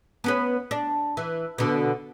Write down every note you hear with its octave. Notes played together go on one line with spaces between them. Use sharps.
B3 C#4 B4
D4
E3
B2 D3